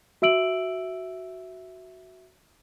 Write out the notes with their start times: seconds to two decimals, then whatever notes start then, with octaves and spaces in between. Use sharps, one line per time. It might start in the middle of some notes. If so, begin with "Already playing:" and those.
0.22 F#4 E5 E6 D7 F#7